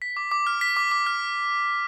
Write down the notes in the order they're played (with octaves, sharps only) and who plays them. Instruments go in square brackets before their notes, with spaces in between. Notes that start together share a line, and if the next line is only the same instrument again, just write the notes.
[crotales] B6
D6
D6
F6
B6
D6
D6
F6